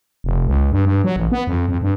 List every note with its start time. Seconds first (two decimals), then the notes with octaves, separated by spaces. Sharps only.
0.24 F1
0.47 C#2
0.72 G2
0.85 G2
1.04 F#3
1.16 A1
1.32 B3
1.47 F2
1.69 F2
1.82 G2